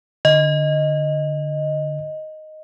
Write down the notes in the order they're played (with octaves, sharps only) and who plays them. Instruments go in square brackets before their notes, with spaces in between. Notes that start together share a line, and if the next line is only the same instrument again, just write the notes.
[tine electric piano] D3 [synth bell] D#5